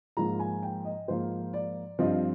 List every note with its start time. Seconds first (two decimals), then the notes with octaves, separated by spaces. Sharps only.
0.17 G#2 F3 A#3 A#5
0.40 G#5
0.63 G5
0.85 D#5
1.08 G#2 F3 A#3 C5
1.53 D5
1.99 G2 F3 C4 D#5